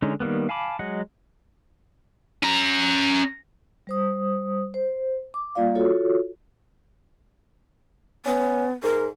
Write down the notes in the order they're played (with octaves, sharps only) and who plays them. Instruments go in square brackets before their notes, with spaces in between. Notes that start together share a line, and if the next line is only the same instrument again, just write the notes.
[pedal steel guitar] D3 G#3 C#4 D#4
D#3 G3 A#3 B3
F5 G#5 A5 B5 D6
F#3 G#3 D#5 F#5
[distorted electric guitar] C#4 A#5
[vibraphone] G3 C5 D#6
C5
D6
G3 A#3 F4 D5 F5
F4 F#4 A4 C#5
[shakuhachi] B3 [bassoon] C#4
[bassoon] G#2 [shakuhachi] A#4